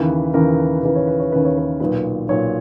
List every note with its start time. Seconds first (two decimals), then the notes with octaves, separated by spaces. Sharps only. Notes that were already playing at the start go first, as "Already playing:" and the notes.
Already playing: D#2 C#3 E3 B4
0.34 D#2 C#3 E3 A#4
0.82 D#2 C#3 E3 B4
0.95 C#5
1.07 B4
1.20 C#5
1.32 D#2 C#3 E3 B4
1.45 C#5
1.57 B4
1.80 B1 A#2 B4
2.29 B1 A#2 C#5